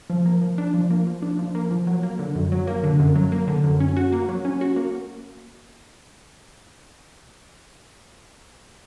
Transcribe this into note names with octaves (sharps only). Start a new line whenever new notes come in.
F3
A#3
F3
D4
F3
A#3
F3
D4
F3
A#3
F3
F#3
A#3
D3
F#2
F#3
A#3
D3
F#2
F#3
A#3
D3
F#2
C#4
F#4
A#3
F#3
C#4
F#4
A#3